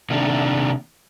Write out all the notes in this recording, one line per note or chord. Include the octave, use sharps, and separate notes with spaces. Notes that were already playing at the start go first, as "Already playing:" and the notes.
C3 D#3 A#3 D4